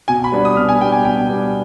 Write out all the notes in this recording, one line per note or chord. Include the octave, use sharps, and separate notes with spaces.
B2 G#5
B5
G3 B3 D4
D#6
B2 F6
G#5
G3 B3 D4 G5
G#5
B2 G5
G3 B3 D4